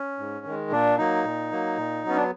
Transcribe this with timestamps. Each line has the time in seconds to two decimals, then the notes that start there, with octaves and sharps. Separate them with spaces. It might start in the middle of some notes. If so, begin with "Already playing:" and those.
Already playing: C#4
0.19 G#2
0.45 D#3 G#3
0.72 A#2 D4
0.98 F#3 A#3 D#4
1.24 A#2
1.51 F#3 A#3
1.77 A#2
2.04 F#3 B3 C#4
2.17 D4